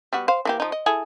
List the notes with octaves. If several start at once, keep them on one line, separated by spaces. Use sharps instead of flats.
G3 B3 F#4
C5 F5
E3 A#3 G4
F3 D#4
D#5
E4 G#4 A4